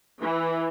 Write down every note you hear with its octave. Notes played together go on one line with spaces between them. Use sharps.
E3